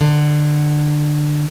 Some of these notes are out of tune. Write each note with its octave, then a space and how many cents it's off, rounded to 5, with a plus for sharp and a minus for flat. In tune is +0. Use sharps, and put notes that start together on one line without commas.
D3 +20